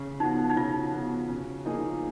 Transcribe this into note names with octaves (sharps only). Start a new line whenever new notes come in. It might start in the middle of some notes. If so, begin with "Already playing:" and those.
Already playing: C#3
F3 B3 D#4 F#4
D#4
C#3 F4
F3 B3 F#4
C#3
F3 A#3 D#4 G#4